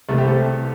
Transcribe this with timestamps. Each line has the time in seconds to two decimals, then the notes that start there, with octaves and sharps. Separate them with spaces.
0.09 C2 C3 E3 A3
0.18 G4 C5
0.27 A4